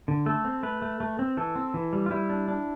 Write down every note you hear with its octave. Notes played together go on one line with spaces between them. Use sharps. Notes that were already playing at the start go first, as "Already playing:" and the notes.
D3
A3 A4
C4
A3 B4
A3
A3
C4
E3 A4
C4
E3
G3
F4
G3 E4
D4
D4